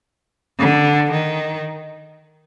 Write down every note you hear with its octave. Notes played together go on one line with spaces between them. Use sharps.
D3
D#3